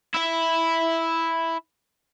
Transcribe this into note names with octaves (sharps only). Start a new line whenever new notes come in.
E4 E5